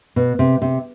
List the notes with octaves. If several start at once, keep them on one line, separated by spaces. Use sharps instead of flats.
B2
C3
C3